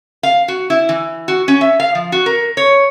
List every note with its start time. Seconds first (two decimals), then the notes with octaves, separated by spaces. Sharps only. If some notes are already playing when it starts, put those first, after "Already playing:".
0.23 F5
0.48 F#4
0.70 E4
0.89 E3
1.28 F#4
1.48 C#4
1.61 E5
1.80 F5
1.95 F3
2.12 F#4
2.26 A#4
2.57 C#5